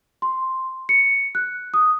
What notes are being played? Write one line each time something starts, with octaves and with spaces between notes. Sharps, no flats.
C6
C#7
F#6
D#6